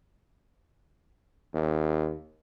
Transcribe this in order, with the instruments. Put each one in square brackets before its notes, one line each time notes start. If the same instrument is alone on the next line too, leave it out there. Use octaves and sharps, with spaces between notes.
[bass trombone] D#2